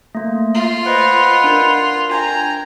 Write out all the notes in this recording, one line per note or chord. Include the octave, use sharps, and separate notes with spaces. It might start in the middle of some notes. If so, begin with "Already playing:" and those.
A3 A#3
F4
B4 C5 D#5 F#5 D#6
D4 A#4
G5 G#5 A#5